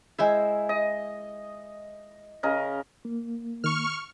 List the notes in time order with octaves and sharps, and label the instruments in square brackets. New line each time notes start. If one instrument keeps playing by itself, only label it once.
[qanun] G#3 C5 E5 [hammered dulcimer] E4
[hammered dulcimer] D#5
C#3 A#4 D#5
[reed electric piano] A#3
[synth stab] D#3 [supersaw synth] C#6 F6